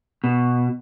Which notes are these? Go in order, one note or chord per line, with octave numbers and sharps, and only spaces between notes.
B2